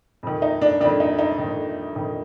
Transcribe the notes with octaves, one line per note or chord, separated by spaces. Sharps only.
F2 D#3
D#4
D4
F2 D#3 D4
D#4
D#4
F2 D#3
F2 D#3